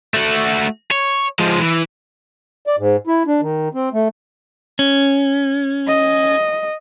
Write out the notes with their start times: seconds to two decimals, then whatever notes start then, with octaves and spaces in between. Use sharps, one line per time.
0.14 A3 F#4
0.91 C#5
1.39 F3 G#3
1.61 E3
2.67 D5
2.78 G#2
3.07 E4
3.27 D4
3.41 D#3
3.74 C4
3.93 A3
4.79 C#4
5.87 D#5